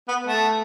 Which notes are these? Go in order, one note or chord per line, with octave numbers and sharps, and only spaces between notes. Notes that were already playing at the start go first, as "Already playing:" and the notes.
B3
A3